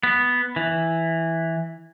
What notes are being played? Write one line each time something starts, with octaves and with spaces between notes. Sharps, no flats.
B3
E3